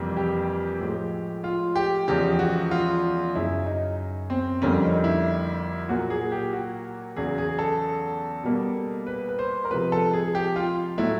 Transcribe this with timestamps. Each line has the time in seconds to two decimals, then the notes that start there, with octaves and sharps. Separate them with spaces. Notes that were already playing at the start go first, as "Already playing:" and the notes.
Already playing: F2 C3 E3 G3 A#3
0.17 G4
0.80 A2 F3 G#3
1.44 F4
1.76 G4
2.08 E2 C#3 F3 G#3 G4
2.39 F#4
2.71 F4
3.35 F#2 C#3 F#3 E4
3.66 D#4
4.30 C4
4.62 F2 D3 G3 A#3 C#4
4.83 D#4
5.04 E4
5.89 A#2 F#3 A#3 F#4
6.10 G#4
6.32 G4
6.53 F#4
7.16 E2 C#3 F#3 G#4
7.38 G#4
7.59 A4
8.44 B2 G3 A#3
9.07 B4
9.29 B4
9.39 C5
9.65 A#4
9.71 C3 F3 G#3 B4
9.92 A4
10.13 G#4
10.35 G4
10.56 F4
10.98 A2 F#3 A3 E4